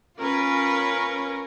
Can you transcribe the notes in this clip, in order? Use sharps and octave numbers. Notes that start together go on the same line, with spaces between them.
C#4 F4 A#4 B4